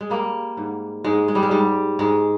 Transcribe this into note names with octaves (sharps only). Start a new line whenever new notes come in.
G#3
G3 A#3
G#2
G#2 G#3
G#3
G3
G#3
G#2 G3
G#2 G#3